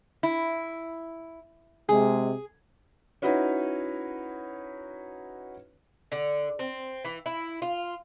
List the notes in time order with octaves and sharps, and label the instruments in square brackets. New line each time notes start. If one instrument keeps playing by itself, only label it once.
[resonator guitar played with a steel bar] E4
[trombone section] C3 G#3 [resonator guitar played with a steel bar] G#4
[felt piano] C#4 D#4 E4 F#4 B4 C#5
[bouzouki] D3
C4
E3
E4
F4